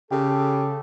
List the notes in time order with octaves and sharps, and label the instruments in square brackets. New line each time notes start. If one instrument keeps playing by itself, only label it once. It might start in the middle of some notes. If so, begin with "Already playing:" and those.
[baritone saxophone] C#3 [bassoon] G4 [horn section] A4